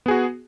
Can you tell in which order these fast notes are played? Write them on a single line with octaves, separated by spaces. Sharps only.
B3 G#4 F#4